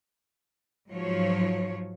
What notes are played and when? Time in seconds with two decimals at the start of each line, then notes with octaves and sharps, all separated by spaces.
0.89 G#2 F3 F#3 C#5